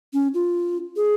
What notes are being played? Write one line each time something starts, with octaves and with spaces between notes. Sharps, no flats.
C#4
F4
G#4